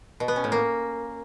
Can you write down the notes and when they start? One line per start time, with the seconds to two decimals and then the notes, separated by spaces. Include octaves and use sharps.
0.20 B2
0.28 B3
0.36 C#4
0.44 A2
0.52 A#3